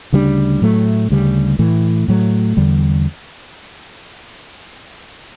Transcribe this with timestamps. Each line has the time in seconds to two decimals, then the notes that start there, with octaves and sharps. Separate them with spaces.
0.13 D2 C#3 G3 D4
0.62 A2 F#3 A3
1.10 D2 C#3 G3
1.59 A2 E3 A3
2.08 A2 F#3 A3
2.57 E2 D3 G3